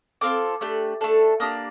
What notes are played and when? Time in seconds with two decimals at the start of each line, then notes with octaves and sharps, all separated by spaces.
0.21 C4 F4 A4 D6
0.61 A3 D4 G4
1.01 A3 D4 A4
1.40 A#3 D4 G4 D#6